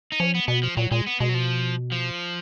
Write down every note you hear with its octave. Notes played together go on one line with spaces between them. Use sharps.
D#4
F3 C#4
B3
B2 B3
F3
A#2 F#3
A#2 G#3
B3
B2 G#3
F#3
F3
F3